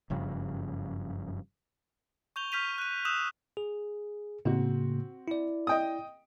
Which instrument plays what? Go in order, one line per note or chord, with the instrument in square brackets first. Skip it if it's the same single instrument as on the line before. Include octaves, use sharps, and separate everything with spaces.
[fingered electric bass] F#1 G2 C#3 F3
[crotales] C#6 G6 F7 G7
C#6 F6 G6 B6 D#7 F7
F#6 D#7
D#6 E6 F#6 G6 E7 F7
[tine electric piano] G#4
[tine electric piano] A2 C#3 A#3 [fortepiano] C4 F#4
[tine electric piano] E4 D5
[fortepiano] D#5 G5 D#6